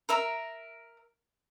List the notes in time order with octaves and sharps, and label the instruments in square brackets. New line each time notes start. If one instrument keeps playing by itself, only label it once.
[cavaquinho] A#4 E5 A#5